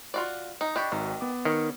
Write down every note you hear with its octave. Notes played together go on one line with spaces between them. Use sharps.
F4 F#4 D5
D#4
D4 G4 D#5 B5 C#6
G#1 D#3 F#4 A#5
B3 D6
D#3 C#4